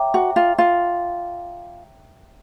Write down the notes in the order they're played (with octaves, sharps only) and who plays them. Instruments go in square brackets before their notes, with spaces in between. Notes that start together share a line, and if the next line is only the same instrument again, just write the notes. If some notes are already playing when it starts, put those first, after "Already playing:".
Already playing: [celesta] C#5 E5 G5 A#5 D6
[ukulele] F#4
F4
F4